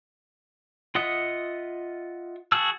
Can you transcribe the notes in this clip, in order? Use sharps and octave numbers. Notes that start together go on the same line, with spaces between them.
F4 D#5 E5 F#5 D#6
F#4 G#4 A5 E6